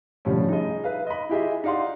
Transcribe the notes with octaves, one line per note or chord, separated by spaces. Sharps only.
A2 D3 F3 G3 C#4
D#4 G#4 D#5
B4 E5 F5
D#5 B5
E4 F4 G4 G#4 D#5 E5
D#4 G4 D5 F5 F#5 C6